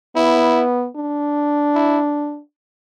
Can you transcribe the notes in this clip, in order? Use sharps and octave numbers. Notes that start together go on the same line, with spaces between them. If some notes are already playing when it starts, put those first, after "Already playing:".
B3 E4
D4
E4